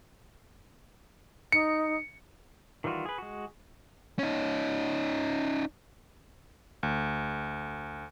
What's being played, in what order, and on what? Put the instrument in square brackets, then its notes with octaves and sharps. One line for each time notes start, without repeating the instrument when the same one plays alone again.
[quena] D#4 [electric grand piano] C#7
[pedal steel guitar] D#3 E3 G3 F4 F#4
G#4 B4
G#3 F#4
[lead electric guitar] C#4 D#4
[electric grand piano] D2